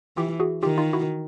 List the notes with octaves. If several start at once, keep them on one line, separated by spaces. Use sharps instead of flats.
E3 F4 G4
F#4 G#4
D#3 F4 G4
D#4 F4
E4 F#4